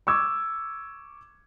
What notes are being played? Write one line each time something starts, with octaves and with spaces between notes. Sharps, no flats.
C#6 D6 E6 G#6